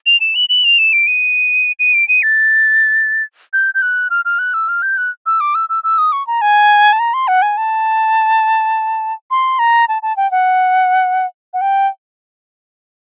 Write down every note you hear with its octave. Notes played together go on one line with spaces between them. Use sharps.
F7
E7
F#7
F#7
F7
E7
D7
D#7
D#7
D7
D#7
A6
G6
G6
F#6
F6
F6
F#6
E6
F6
G6
F#6
E6
D6
E6
E6
E6
D#6
C#6
A#5
G#5
A5
A#5
C6
F#5
G#5
A5
C6
A#5
A5
A5
G5
F#5
F#5
G5